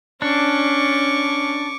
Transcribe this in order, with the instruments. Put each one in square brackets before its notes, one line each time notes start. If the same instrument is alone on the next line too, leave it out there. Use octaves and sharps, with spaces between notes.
[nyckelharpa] C#4 [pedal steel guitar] D4 [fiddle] C#6 D6